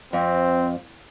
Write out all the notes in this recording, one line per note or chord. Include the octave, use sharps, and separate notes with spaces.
F2 C4